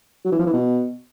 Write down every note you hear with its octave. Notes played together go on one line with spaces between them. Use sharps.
F#3
E3
F3
E3
B2